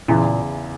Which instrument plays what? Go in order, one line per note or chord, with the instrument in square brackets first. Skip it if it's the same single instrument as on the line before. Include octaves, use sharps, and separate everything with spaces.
[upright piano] E2 C#3 E3 [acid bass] A#2